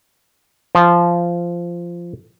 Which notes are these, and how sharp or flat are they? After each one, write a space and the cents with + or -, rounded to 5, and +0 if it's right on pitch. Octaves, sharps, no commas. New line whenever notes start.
F3 -15